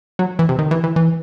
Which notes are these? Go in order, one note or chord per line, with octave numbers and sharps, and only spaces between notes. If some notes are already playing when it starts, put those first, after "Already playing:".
F#3
E3
C3
D#3
E3
E3
E3